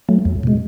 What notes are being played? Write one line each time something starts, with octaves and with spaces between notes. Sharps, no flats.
F#3 A3
E2
B2 G#3